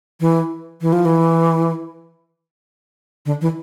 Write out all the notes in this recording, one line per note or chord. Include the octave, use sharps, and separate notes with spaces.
E3
E3
F3
E3
D3
E3